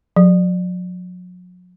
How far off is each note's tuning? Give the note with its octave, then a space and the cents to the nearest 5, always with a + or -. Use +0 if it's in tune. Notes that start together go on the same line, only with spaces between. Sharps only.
F#3 -45